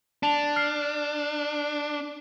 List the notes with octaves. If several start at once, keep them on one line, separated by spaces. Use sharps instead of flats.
D4 A5 F7
F6 C7